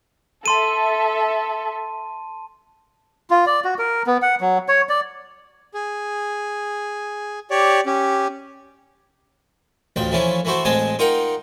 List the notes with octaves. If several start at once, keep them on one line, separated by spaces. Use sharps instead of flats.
A4 E5 A5 C6 D#7
F4
D5
F#4
A#4
B3
F#5
F#3
C#5
D5
G#4
G4 C#5 D5
C#4 G4
A1 D2 F3 G5
E3 F3 A3 C#4 E4
E3 A3 E4 F#4 C5
A1 G#3 C4 D#5 G#5 A5
D#4 F4 A#4 F#5 G5